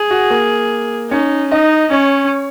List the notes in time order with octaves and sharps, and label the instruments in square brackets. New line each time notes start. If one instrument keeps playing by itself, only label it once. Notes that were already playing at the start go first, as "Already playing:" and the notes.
Already playing: [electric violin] G#4
[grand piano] F#4
A#3
[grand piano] C#4 [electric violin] D#4
[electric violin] D#4 [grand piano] D#5
[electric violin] C#4 [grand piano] C#5